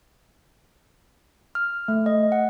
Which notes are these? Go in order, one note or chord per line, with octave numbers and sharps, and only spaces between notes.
F6
A3
D#5
F#5